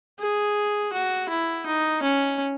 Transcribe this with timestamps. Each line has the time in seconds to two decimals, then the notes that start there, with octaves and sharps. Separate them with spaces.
0.19 G#4
0.93 F#4
1.29 E4
1.66 D#4
2.02 C#4